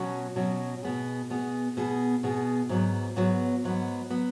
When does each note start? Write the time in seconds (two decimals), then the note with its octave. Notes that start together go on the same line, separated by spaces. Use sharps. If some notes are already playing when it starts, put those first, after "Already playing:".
Already playing: B2 F#3 C#4 F#4
0.36 B2 F#3 C#4 F#4
0.83 B2 B3 G#4
1.30 B2 B3 G#4
1.77 B2 B3 G#4
2.23 B2 B3 G#4
2.69 G#2 F#3 B3
3.16 G#2 F#3 B3
3.64 G#2 F#3 B3
4.10 F#3 B3